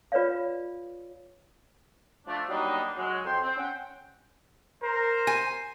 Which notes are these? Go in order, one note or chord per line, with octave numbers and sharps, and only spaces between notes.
F4 B4 C#5 D5 F5
F3 A3 D4
F#3 G3 A#3 B3 D4 D#4
F#3 G#3
F2 G5 C6
C4
C#4 F#5 G5
A#4 C5
G#5